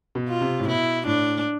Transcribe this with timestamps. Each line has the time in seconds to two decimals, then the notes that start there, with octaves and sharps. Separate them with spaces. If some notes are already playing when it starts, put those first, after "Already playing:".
0.15 B2
0.28 F4
0.41 C3
0.60 A2
0.68 B2 E4
1.06 A2 D4